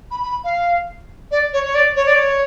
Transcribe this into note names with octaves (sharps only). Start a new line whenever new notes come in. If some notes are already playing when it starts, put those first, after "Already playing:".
B5
B5
F5
D5
C#5
C#5
D5
C#5
D5
C#5